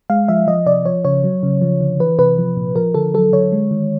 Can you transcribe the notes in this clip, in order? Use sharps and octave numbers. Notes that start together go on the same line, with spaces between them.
G#3 F5
F3 E5
F3 D#5
C3 D5
F3 C#5
C#3 C#5
F#3
C#3
F3
D3
E3 B4
C3 B4
F3
A#2
F3 A#4
D3 A4
F#3 A4
D3 C#5
G#3
D#3